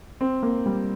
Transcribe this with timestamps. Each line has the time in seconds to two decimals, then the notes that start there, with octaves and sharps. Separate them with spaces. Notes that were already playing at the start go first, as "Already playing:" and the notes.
0.21 C4
0.43 A#3
0.66 G3